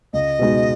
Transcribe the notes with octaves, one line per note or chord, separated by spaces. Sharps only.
C#2 D#5
B2 G#3 D#4 F#4